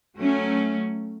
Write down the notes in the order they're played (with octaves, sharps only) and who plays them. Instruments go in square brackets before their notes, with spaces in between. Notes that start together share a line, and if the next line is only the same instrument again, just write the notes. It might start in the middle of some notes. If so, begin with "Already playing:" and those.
[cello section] F#3 A3 C#4